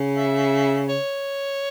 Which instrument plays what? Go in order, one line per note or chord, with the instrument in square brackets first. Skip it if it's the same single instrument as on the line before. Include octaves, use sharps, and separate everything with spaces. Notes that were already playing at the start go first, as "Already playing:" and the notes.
Already playing: [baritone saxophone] C#3
[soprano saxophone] E5
C#5